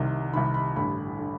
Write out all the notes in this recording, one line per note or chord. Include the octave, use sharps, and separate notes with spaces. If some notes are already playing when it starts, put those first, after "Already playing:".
Already playing: C2 C3 D#3
C2 C3 D#3 B5
B5
A1 G2 D3 B5
D3